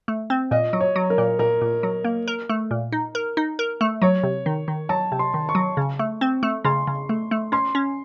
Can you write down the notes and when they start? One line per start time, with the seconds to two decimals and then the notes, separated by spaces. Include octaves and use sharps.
0.08 A3
0.30 C4
0.51 A#2 D#5
0.73 F#3
0.81 C#5
0.96 F#3
1.10 A#4
1.18 A#2
1.39 A#2 A#4
1.62 A#2
1.83 F#3
2.04 A#3
2.28 A#4
2.49 A3
2.71 A#2
2.92 D#4
3.15 A#4
3.37 D#4
3.59 A#4
3.81 A3
4.02 F#3 C#5
4.23 C3
4.46 D#3
4.68 D#3
4.89 F#3 A5
5.12 C3
5.19 C6
5.34 D#3
5.49 C#6
5.55 F#3
5.77 C#3
5.99 A3
6.21 C4
6.43 A3
6.65 C#3 C6
6.87 C#3
7.09 A3
7.31 A3
7.52 C#4 C6
7.75 C#4